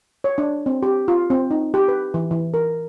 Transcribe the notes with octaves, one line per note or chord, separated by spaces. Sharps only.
C#5
D4
C4
G4
F4
C4
D#4
G4
B4
E3
E3
A#4